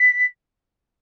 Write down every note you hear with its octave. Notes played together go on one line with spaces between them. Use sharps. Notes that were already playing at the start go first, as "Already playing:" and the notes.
Already playing: B6